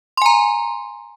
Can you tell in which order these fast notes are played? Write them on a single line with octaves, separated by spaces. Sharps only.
C6 G#5 A#5